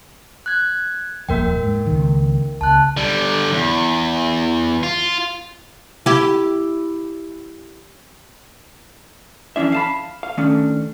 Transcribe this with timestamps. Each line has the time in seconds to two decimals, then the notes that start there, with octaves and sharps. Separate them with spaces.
0.46 F#6 G#6
1.29 D#1 A#1 F2 A#3 A#4 G5
1.62 G#2
1.87 C#2 D#3
2.61 C#2 A5 F#6
2.97 D3 G3
3.52 E2
4.83 F4
6.06 E4 G4
9.56 F2 E3 C#4 D4 E5
9.72 F5 A5 B5
10.23 F5
10.37 D#3 A3 C#4 D4